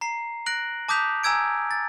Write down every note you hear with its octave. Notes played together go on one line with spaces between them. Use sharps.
A#5 C7
F#6 A#6 D7 F#7
A5 D6 D#6 G6 B6 F7
G#5 A#5 E6 G#6 D7
A6